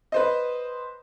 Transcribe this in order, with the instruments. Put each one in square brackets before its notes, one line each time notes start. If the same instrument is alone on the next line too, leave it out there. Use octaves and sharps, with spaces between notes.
[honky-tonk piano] B4 C5 D#5